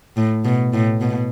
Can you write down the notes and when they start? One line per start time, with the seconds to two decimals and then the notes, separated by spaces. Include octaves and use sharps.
0.17 A2
0.45 B2
0.74 A2
1.01 B2